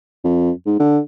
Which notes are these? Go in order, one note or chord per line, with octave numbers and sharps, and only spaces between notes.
F2
G#2
D3